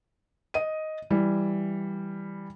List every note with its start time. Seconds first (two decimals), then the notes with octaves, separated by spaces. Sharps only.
0.54 D#5 D#7
1.10 E3 G3